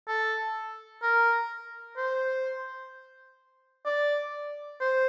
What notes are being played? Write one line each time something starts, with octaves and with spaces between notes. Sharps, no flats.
A4
A#4
C5
D5
C5